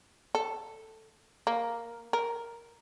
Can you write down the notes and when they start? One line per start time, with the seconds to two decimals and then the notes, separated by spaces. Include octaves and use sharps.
0.35 A4
1.47 A#3
2.13 A#4